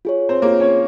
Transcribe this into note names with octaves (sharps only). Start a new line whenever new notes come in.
F4 G#4 C#5
C4 C5
A#3 F4 G#4 A#4 C#5
C#4 C#5